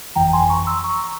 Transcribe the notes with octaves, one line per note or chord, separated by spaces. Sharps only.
G1 F2 E3 G5 A#5
G#5 C6
A#5 C#6
C6 E6
A#5 C#6